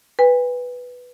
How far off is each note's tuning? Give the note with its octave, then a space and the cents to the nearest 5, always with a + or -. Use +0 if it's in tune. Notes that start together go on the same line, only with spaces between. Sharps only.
B4 +0 G#5 -45